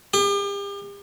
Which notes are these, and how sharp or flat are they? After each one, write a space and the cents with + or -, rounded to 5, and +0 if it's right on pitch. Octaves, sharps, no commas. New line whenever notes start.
G4 +40